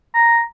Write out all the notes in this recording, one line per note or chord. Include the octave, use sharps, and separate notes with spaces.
A#5